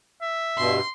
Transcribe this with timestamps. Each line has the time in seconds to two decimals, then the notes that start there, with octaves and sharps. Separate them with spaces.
0.22 E5
0.58 G2 B2 C6